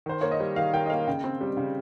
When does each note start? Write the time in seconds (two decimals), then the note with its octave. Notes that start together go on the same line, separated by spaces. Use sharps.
0.06 D#3 C5
0.21 A#3 C#5
0.31 D#5
0.40 G3
0.56 D#3 F5
0.73 D#3 G5
0.86 D#5
0.90 A#3 F5
1.07 C#3 G5
1.24 C4
1.41 G3
1.57 C#3